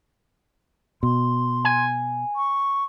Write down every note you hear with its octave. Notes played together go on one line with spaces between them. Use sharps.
B2 C6
G#5
C#6